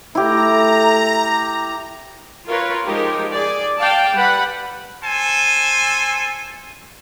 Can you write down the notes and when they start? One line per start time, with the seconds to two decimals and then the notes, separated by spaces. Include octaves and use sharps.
0.15 A3 E4 G4 A#5
2.47 F4 A#4 B4 C#5
2.85 F3 G#3 D#4 G4 A#4
3.33 G#4 D5
3.78 D5 F5 G5 A5
4.13 G3 B4 F#5 B5
5.04 A4 C5 G#5